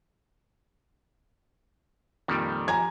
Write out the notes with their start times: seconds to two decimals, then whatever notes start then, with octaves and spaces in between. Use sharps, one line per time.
2.28 F2 A#2 D#3 G3
2.68 F3 G4 G#5 A#5 G#6